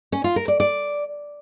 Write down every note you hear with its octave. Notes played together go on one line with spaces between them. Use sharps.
C#4
F4
A#4
D5
D5